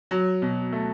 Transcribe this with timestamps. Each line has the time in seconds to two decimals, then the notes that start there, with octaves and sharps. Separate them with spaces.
0.11 F#3
0.42 B2
0.72 A3